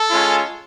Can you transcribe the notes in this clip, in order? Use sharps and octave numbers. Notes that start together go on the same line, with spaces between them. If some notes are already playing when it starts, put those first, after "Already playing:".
Already playing: A4
G#3 C#4 F4